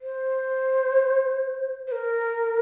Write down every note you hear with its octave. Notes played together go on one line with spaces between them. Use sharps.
C5
C5
A#4